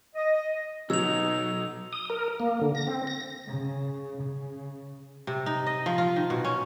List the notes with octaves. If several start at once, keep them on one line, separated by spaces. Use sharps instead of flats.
D#5
B1 F#3 D#4 E6 F7
D#6
A#4
A#3
D3
A#6
C4
A#6
C#3
C#3
C3
D#4
D#5
F3
F4
D#3
B2
C#4